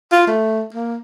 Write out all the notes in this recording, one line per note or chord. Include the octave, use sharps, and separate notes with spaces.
F4
A3
A#3